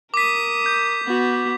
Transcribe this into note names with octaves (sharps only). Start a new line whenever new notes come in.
A#4 D6 D#6 B6
G6
B3 F#4